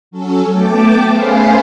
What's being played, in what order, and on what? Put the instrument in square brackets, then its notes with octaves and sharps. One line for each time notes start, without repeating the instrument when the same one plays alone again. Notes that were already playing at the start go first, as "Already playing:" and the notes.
[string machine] F#3 C#4 A4
A3 B3 G5 A5 D6
A3 C#4 G#4 B4 C5 F5